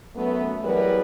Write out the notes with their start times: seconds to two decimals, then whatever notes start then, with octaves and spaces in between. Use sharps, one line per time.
0.16 F#2 A3 B3
0.64 E3 F#3 G3 G#4 A#4 B4